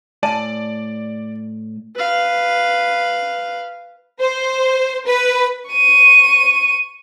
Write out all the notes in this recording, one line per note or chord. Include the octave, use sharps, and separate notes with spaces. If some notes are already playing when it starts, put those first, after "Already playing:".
A2 D5 G#5 A5
B4 F5
C5
B4
C#6 D#7